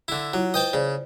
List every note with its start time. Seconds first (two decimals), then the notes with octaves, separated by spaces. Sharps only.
0.08 D3 E4
0.33 F#3 E4 F4
0.54 B4 C5 D#5 G5 A5
0.73 C#3 C5 D5